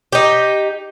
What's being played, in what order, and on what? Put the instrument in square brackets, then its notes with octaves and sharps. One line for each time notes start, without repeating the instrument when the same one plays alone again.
[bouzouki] D#4 G4